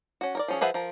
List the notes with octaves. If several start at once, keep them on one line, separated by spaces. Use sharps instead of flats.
C#4 F#4
A#4 C#5 D5
F3 C#4 G#4
F3 G#4 B4 E5 F#5
F3 A#4